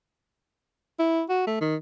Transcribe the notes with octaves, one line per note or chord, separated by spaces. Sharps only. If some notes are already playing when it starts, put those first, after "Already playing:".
E4
F#4
A3
D#3